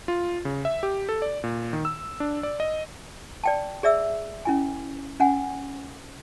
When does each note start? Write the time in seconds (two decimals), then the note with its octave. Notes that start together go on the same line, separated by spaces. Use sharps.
0.08 F4
0.45 C#3
0.65 E5
0.83 G4
1.09 A4
1.22 D5
1.44 A#2
1.73 D#3
1.85 E6
2.20 D4
2.43 D5
2.60 D#5
3.44 D5 G5 A5
3.83 G#4 D5 E5 E6
4.45 C#4 E4 G#5
5.20 C#4 F#5 G#5